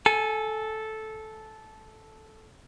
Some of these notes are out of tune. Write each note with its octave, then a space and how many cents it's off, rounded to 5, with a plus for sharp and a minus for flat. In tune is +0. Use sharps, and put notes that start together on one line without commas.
A4 -10 G#5 +15